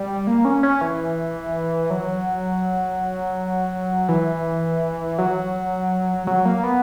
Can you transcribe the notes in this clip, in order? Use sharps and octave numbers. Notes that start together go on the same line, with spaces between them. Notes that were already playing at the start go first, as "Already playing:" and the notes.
Already playing: G3
A#3
C#4
C#4
E3
F#3
E3
F#3
F#3
A#3
B3